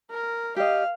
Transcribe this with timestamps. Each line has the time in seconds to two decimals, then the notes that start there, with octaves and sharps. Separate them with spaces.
0.11 A#4
0.56 G4 D#5 F5